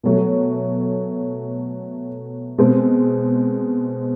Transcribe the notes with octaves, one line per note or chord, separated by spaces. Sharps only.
B2 F#3 A3
B2 G#3 C4